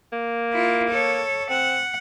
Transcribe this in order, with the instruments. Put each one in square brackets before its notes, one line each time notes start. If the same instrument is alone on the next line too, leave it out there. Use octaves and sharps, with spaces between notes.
[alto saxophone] A#3
[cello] E4 F4
A4 C#5
[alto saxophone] C4 [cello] F#5